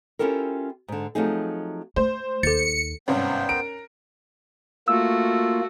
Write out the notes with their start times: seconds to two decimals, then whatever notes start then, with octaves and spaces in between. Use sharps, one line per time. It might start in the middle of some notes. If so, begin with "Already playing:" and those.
0.19 C#4 E4 F4 G4 A4 A#4
0.88 G#2 D3
1.15 F3 F#3 A3 C4 D#4 G#4
1.96 A3 C5
2.43 D#2 A4 A6 C#7
3.08 G#1 G2 C3 B3 C#4 C5 G5
3.49 A#4 D7
4.88 A3 A#3 F4 F#4 E6